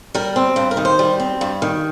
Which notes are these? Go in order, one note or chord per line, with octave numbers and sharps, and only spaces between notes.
G3 A#4
C4
G2 C5
A#4
D#3
C5
G3
C4
G2
D#3